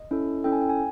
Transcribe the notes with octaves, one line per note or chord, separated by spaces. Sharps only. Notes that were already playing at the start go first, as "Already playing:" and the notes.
Already playing: D#5
C#4 E4 A4
C#4 E4 A4 G5
G#5
G5
G#5